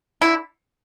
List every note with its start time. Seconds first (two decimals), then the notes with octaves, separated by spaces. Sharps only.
0.21 D3 E4